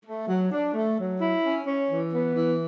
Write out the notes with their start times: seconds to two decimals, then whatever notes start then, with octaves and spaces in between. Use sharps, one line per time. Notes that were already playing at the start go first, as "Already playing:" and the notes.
0.06 A3
0.28 F#3
0.52 D4
0.74 A3
0.97 F#3
1.20 E4
1.44 C#4
1.67 C#4
1.89 E3
2.12 B3
2.35 E3